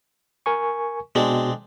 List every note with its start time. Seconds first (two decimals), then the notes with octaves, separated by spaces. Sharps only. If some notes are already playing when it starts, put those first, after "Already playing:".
0.46 A#4 G#5 C#6
1.15 B2 G#3 C4 D4